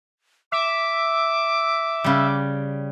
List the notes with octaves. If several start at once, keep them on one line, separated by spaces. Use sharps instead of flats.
E5 D6
C#3 G3